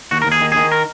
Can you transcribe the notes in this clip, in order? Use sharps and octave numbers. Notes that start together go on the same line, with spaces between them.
D#2 F#4
A#4
D#2 G#4
D#3
D#3 G#4
A#4